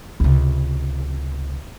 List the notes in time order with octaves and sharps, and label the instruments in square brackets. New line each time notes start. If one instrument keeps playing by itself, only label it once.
[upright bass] C#2 C3